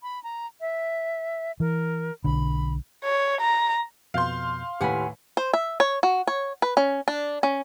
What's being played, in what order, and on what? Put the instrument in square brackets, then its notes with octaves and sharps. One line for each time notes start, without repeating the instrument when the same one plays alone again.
[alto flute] B5
A#5
E5
[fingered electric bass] E3 [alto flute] A#4
[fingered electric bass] B1 D3 [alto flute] B5
[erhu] C#5
A#5
[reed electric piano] F2 B2 G6 [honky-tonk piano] F5 C6
[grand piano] D#2 A2 B4 [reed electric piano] G4 B5 [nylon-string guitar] F#5 G#5
[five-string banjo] C5
E5
C#5
F#4
C#5
B4
C#4
D4
C#4